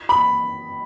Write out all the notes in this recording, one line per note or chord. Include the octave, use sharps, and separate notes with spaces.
B5